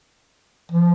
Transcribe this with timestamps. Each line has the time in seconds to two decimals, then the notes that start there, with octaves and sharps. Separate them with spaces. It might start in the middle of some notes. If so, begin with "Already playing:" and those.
0.72 F3